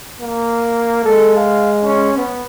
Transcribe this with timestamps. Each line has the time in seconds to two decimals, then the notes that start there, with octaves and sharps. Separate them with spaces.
0.20 A#3
1.04 G#3 A4
1.36 F5
1.84 C#4
2.17 B3